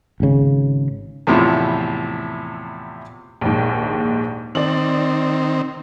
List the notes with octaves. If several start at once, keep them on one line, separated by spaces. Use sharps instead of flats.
G#1 C#3
E2 A2 C3 F3 E4
A#1 D#2 G#2
D#3 C4 D5 F#7